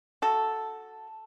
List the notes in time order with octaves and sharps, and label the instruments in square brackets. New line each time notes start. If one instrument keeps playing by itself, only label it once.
[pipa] F#4 A4